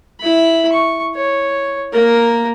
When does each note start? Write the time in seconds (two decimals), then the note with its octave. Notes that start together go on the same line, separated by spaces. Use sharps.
0.21 E4 B5
0.72 C#6
1.15 C#5
1.92 A#3 A#4